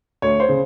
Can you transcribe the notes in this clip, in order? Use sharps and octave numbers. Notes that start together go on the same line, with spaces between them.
D2 C#5
C5
C#3